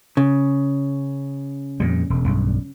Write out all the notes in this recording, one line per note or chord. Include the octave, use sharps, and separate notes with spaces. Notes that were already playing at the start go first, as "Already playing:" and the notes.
C#3
F2 A#2 G3
E1
B1 G2